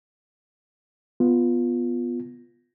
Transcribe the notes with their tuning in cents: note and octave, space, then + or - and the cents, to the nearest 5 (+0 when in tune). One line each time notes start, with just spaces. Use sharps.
B3 +0 F4 +0